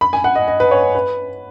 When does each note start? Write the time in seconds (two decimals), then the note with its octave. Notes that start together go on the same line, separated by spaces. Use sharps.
0.01 B5
0.13 G#5
0.24 F#5
0.35 D#5
0.48 D#5
0.60 B4
0.71 C#5
0.95 B4